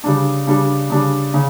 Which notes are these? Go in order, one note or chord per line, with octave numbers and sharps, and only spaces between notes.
C#3 G3 D4
C#3 G3 D4
C#3 G3 D4
C#3